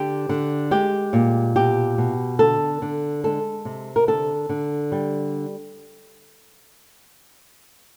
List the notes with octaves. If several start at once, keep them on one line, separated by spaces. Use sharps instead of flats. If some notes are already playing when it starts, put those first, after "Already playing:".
Already playing: D3 G4
D3
G#3 G4
A#2
B2 G4
B2
D3 A4
D3
G#3 A4
C3
A#4
D3 A4
D3
G3